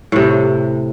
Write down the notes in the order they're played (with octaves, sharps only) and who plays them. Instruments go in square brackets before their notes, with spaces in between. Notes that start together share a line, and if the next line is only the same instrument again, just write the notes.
[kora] A2 C3